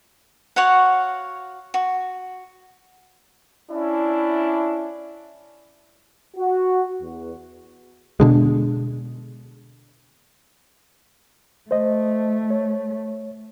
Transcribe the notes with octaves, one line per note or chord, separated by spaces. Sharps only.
F#4 C#5 F5 F#5
F#4
C#4 D4 E4
F#4
E2
B2 D3 G#3
A3 C5 D#5
C#5